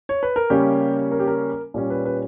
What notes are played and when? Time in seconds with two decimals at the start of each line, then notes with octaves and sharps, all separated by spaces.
0.09 C#5
0.23 B4
0.36 A#4
0.50 C#3 G3 A#3 C#4 G4
1.12 A#4
1.20 G4
1.27 A#4
1.74 A#2 G3 C#4
1.90 B4
2.05 B4